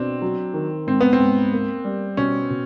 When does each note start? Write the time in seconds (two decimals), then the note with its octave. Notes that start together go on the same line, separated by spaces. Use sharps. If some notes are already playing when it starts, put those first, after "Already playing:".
Already playing: B2 C4 D4
0.22 F#3
0.54 D#3
0.87 G#2 C4
1.01 B3
1.13 C4
1.19 G#2
1.53 A#3
1.85 G3
2.17 B2 C#4
2.50 B2